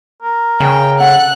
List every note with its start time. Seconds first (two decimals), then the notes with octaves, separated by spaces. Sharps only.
0.22 A#4
0.60 C#3 G5 G#5
1.00 C#4 A4 F#5 F#6